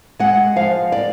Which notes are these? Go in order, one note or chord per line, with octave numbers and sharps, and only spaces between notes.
G#3 F#5
F3 F5
D5